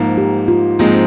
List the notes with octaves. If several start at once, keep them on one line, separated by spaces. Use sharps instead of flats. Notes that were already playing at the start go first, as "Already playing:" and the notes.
Already playing: G#2 F3 A#3
G4
F4
G#2 F3 G#3 A#3 C4 D#4